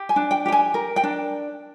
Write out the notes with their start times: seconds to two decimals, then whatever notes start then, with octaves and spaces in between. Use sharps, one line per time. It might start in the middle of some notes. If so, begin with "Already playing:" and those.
Already playing: G4
0.09 G#5
0.16 D4
0.31 G5
0.46 G4 G5
0.52 G#5
0.74 A#4
0.96 G5
1.04 D4